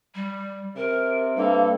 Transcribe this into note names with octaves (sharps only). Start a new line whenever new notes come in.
G3
C3 A#4
G2 A#3 A4